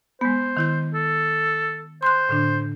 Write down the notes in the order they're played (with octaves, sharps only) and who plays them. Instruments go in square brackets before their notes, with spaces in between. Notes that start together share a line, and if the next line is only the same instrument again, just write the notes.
[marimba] G#3 B3 [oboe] C5
[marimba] D#3 E4 G6
[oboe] A4
[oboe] C5 [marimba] C6 F#6
[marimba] A2 D3 D4